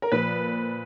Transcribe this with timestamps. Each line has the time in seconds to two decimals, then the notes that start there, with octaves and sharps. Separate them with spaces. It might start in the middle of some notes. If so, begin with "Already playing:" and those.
0.02 A#4
0.12 A#2 F3 B4